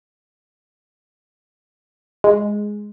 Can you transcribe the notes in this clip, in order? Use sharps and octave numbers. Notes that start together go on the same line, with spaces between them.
G#3